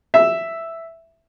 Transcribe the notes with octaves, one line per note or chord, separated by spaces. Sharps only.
E5